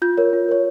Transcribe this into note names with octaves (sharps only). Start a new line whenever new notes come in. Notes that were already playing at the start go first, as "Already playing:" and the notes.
F4 G6
A#4 C#5
F4
A#4 C#5